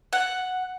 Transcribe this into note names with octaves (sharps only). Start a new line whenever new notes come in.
F#5